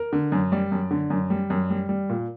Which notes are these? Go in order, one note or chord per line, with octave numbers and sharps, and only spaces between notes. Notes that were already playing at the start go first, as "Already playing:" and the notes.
Already playing: A#4
D3
F#2
G3 D5
F#2
D3
F#2
G3
F#2
G3
G3
A#2